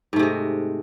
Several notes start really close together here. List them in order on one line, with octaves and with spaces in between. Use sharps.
G#2 A3 C3 G#3